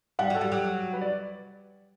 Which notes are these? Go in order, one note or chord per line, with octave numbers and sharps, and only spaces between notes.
G3 F#5
F#3
A4
G3
F#3 G4
B4
D5